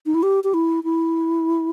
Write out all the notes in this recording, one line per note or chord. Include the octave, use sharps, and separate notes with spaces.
D#4
E4
G4
G4
E4
E4